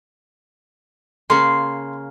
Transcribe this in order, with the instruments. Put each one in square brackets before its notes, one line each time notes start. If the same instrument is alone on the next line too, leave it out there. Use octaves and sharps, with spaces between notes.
[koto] C#3 A#3 [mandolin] C6